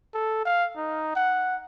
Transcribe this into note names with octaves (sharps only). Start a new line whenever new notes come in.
A4
F5
D#4
F#5